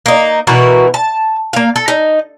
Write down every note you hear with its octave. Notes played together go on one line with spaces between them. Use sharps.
A#3 D#4
B2 E3 F#4 A#4
A5
A#3 F5
A4
D#4